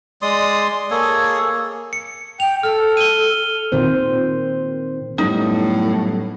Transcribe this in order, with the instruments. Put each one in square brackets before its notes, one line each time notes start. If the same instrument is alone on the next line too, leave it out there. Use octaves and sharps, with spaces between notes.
[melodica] G#3 D5 C6 D#6
A#3 G#4 A4 C#5
[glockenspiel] C#7
[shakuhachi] G5 [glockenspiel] F7
[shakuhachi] A4 [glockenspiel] F6
[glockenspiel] D#7 G7
[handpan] A#2 D#3 C4 C5
[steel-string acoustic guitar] F#2 G3 B3 [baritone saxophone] A2 [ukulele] D#4